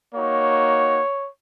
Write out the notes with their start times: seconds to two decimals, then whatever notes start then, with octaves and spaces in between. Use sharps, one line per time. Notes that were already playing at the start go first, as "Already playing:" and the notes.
0.14 A#3 D#4 F#4 C#5